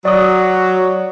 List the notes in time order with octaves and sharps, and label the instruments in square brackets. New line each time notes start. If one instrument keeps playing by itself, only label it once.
[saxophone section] F#3 [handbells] D5 D#6